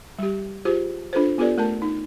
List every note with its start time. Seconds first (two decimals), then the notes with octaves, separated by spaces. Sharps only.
0.19 G3 G4
0.65 F4 G4 G#4 C5
1.13 D4 F4 A4 B4 C5
1.38 B3 F4 G4 A4 B4 D5
1.58 A3 A#4 A5
1.82 D#4